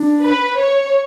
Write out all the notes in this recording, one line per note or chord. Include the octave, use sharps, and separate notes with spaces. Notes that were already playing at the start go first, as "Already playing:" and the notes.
Already playing: D4
B4
C#5